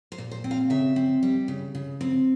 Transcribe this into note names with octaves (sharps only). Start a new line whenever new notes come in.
C5
A#2
C5
C4
F5
C#3 E5
C4
G3
C#3
C#3
C4